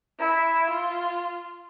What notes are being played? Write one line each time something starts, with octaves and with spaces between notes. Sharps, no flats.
E4
F4